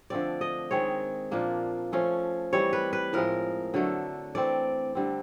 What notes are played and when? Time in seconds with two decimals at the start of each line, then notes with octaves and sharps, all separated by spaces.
0.10 D3 F3 A3 C4 D5
0.41 D#5
0.71 D#3 G#3 C4 C#5
1.31 A#2 F3 A#3 D4
1.92 F3 A3 C#4
2.53 E3 G3 C4 C#5
2.73 B4
2.93 B4
3.13 A2 F3 G#3 A#4
3.74 D3 F#3 A3
4.35 E3 A3 C4 D5
4.95 D3 G3 C4